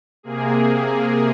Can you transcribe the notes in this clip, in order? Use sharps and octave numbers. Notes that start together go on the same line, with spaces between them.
C3 A#3 G#4